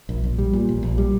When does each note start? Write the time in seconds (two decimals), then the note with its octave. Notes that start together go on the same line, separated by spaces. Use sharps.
0.09 A#1
0.24 A#1
0.38 G3
0.53 A#2
0.69 A#1
0.83 A#1
0.98 G3